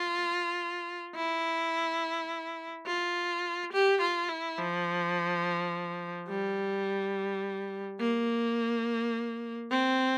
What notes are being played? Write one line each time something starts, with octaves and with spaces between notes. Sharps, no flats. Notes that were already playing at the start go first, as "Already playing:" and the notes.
Already playing: F4
E4
F4
G4
F4
E4
F3
G3
A#3
C4